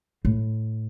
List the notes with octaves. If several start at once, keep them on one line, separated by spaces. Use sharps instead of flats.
A2